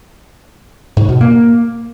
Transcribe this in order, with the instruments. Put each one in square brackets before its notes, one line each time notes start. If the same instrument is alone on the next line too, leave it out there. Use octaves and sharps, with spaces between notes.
[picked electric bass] G#2
B2
A#3